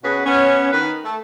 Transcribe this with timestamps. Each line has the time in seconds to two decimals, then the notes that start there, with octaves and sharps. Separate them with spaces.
0.03 B2 C#4 F#4 G#4 B4
0.26 B3 C#4
0.72 D#3 B4
1.04 A3